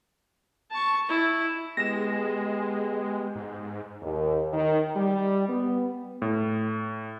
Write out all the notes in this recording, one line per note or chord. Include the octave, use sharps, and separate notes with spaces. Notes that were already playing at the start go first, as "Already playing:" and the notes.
A5 C#6
E4
G#3 B3 G4 A#6 E7
G#2
D#2
D#3
G3
B3
A2